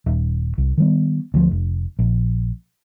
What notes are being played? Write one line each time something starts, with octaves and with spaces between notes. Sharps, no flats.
D#1
C2
D#3 G3 B3
D2 F3
F1
A#1